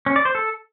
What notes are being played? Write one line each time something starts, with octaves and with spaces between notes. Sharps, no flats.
C#4
D5
C5
A4